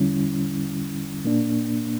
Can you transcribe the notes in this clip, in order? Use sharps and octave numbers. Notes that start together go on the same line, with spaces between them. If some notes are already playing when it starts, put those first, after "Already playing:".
Already playing: E2 D3 G3 C#4 E4
A#2 A#3 D4